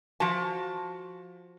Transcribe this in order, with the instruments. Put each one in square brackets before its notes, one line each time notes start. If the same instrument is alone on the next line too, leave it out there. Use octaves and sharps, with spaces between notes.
[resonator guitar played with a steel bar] F3 F#4 A5